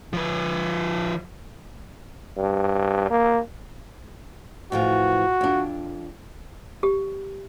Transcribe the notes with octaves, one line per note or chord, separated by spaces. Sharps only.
F3 B4
G2
A#3
A2 E3 F3 F#4
F2 D4
G4